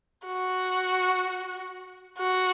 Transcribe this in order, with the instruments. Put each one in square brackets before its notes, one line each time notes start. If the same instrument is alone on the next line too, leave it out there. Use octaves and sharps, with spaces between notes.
[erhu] F#4
F#4